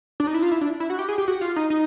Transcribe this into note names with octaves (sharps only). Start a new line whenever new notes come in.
D4
D#4
E4
F4
E4
D4
E4
F#4
G4
G#4
G4
F#4
F4
D#4
D#4